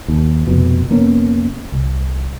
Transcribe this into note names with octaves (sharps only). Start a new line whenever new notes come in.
D#2
F1 F2 B2
F1 A#3 B3 C#4
C2